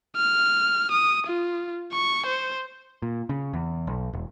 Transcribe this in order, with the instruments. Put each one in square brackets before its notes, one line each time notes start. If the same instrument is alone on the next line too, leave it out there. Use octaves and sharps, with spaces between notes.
[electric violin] F6
D#6
F4
C#6
C5
[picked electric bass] A#2
C#3
E2
B1
E1